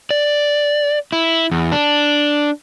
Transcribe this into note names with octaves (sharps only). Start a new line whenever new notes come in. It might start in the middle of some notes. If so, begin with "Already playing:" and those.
D5
E4
E2
D4